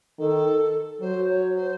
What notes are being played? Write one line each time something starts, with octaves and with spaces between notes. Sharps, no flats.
D#3 A4
F#3 C5
C#5
C5